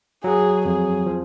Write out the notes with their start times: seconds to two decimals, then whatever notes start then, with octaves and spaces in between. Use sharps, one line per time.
0.24 F#3 G#4
0.65 F2 G#4
1.06 F3